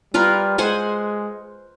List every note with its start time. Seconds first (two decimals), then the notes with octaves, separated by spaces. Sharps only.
0.14 G3 F4 A#4 B4
0.58 G#3 C5 F#5 G#5